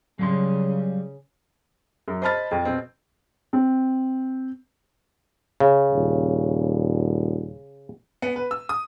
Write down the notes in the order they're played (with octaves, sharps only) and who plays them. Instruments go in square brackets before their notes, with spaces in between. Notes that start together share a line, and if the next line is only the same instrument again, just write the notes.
[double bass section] C#3 [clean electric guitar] F#3 G3 C6
[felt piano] F#2
C5 D#5 A5 B5 F6 A6
F2
B2 C4
C4
[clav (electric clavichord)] C#3
[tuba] D#1
[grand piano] B3
B4
E6
D#6